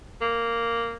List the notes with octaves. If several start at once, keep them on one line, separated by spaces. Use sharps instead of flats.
A#3